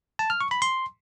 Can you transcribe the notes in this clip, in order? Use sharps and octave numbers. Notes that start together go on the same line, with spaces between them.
A5
F6
C#6
B5
C6